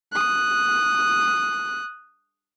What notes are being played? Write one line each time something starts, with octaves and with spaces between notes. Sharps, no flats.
D#6 F#6